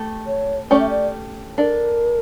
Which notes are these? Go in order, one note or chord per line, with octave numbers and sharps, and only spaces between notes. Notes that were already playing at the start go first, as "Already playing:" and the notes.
Already playing: A3 G4
C#5
A3 C#4 G4 C#5 D5
E5
D5
D4 A4 A#4 D5